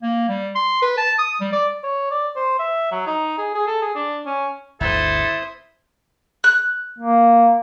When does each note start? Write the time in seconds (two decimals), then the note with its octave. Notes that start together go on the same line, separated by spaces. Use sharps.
0.02 A#3
0.29 G3
0.55 C6
0.82 B4
0.97 A5
1.18 D#6
1.40 G3
1.52 D5
1.83 C#5
2.11 D5
2.36 C5
2.59 E5
2.92 F#3
3.07 D#4
3.38 G#4
3.55 G#4
3.67 A4
3.82 G#4
3.95 D4
4.26 C#4
4.81 G1 D2 E4 A4 C5 D#6
6.44 F#6
6.98 A#3